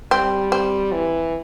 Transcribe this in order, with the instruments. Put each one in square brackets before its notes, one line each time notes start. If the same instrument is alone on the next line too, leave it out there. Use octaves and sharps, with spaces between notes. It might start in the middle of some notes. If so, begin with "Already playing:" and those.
[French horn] G3 [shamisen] C4
[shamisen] C4
[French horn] E3